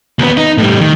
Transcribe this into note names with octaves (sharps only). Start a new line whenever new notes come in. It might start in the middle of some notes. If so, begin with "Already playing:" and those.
D#2 B3
D#4
A2 G3
D#3